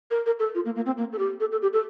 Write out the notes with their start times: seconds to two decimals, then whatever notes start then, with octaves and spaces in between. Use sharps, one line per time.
0.11 A#4
0.26 A#4
0.39 A4
0.55 F4
0.65 A#3
0.76 A#3
0.86 C4
0.98 A#3
1.13 A4
1.19 G4
1.40 A4
1.52 A4
1.62 G4
1.73 A4